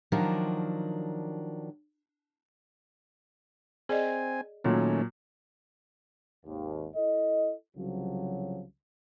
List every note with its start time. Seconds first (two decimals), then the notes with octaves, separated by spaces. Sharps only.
0.12 D#3 F3 F#3 D4 A#4
3.89 C4 G#4 D5 D#5 G#5
4.64 A#2 D#3 F#3 A3 C#4
6.46 G#1 D#2
6.97 E4 A4 D#5
7.76 C2 C#3 F3 F#3